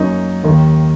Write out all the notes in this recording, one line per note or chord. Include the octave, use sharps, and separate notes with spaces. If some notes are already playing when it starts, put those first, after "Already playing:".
Already playing: F#2 F#3 A#3 D#4
D#2 D#3 A#3